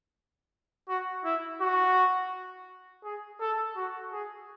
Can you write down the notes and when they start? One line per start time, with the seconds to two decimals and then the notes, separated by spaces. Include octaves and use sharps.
0.89 F#4
1.25 E4
1.61 F#4
3.04 G#4
3.40 A4
3.77 F#4
4.12 G#4